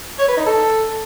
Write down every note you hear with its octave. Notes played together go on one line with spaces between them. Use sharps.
C#5
B4
D#4
A4